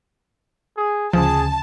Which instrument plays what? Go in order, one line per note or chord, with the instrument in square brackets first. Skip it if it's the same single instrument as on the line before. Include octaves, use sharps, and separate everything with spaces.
[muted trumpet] G#4
[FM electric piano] D2 C#3 [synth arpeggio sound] F3 [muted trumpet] G#4 [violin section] A5